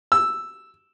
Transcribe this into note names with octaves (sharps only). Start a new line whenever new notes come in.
E6